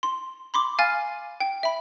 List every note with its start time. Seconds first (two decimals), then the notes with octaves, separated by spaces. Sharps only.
0.03 C6
0.54 B5 C6 D6
0.79 F5 G#5 F6 A6 D#7
1.40 G5
1.63 E5 B5